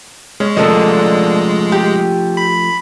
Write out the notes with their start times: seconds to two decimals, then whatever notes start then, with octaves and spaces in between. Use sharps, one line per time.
0.40 G#3 C#4
0.57 D3 F3 A3 A#3 C#4 D#5
1.72 G4
2.37 B5